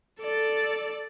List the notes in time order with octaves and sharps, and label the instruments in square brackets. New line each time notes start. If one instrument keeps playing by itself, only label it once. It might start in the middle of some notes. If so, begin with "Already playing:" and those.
[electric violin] A4 D5